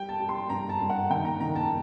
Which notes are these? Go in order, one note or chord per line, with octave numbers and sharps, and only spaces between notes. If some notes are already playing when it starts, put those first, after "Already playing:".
Already playing: G3 G5
A5
G3
C6
G2 A#5
A5
G2
F#5
D#3 G5
A#5
D#3 A#5
A5